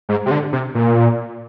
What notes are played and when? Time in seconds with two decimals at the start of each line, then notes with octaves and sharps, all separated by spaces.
0.09 G#2
0.26 C3
0.31 D3
0.53 C3
0.75 A#2